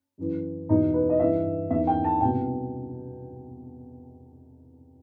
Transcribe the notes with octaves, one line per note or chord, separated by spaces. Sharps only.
F#2 E3
E2 B2 D#4
B4
D#5
G2 E3 E5
E2 D#3 E5
G5
A5
C2 B2 G5